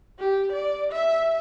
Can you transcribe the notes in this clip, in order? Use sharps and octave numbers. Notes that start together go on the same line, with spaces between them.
G4
D5
E5